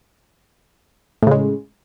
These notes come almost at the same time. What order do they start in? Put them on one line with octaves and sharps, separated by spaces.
A2 C#3 G#3